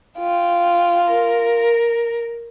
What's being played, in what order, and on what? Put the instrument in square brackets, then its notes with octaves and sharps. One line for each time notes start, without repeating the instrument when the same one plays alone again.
[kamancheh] F4 [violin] G5
[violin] A#4